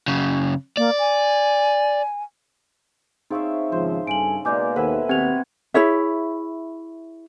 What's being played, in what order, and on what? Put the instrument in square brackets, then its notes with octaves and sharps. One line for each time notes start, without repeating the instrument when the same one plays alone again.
[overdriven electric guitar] F#2 C#3
[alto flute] A#3 [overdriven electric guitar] D5
[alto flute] G#5
[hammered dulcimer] C4 C#5 E5 [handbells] D#4 G#4 F5
[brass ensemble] G#1 C#3 F3 [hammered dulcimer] C5
[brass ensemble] G2 A4 G#5 [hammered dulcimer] C#3 [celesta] D7 F#7
[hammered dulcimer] B2 G#3 A#3 [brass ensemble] D5 [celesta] G#5 D6 G6
[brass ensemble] D#2 [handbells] A4 [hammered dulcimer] B4 E5 G#5 [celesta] C5 F#5
[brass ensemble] D#2 B3 [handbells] C4 F#5 G#6 [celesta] G4 F7
[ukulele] E4 G#4 C#5 E5